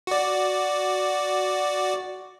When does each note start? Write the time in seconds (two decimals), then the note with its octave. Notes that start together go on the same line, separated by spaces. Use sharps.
0.07 F#4 D5